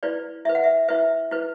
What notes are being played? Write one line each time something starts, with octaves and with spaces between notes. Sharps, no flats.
E4 B4 D5
E4 B4 E5
F#5
E5
E4 B4 E5
E4 B4